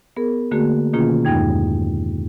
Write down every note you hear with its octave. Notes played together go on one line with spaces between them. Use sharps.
B3 G#4 A#4
D3 A3 A#3 F#4 G#4
B2 D#3 A#3 C#4 F4 G#4
E2 G2 G#3 D#4 G5 G#6